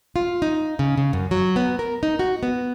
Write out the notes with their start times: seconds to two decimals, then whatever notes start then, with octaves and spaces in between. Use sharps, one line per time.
0.16 F4
0.42 D#4
0.79 C#3
0.98 C#3
1.13 F#2
1.31 F#3
1.56 B3
1.79 A#4
2.03 D#4
2.19 F#4
2.43 B3